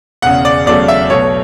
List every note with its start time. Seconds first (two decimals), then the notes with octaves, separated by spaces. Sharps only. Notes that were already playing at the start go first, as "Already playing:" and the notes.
0.22 E1 E2 C#3 F#5
0.45 D5
0.66 E1 E2 C#3 F#3 A3 D5
0.88 E5
1.10 B1 B2 F#3 A3 C#5